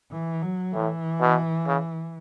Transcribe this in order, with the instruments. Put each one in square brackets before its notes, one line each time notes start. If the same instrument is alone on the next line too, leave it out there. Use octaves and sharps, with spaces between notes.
[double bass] E3
F#3
[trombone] A2 [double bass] E3
[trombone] B2
C#3